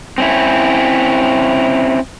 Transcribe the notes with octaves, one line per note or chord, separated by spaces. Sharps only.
C4 C#4 E4